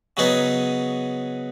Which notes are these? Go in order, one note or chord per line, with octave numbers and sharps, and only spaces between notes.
C#3 F#3 B3 D#4 G#4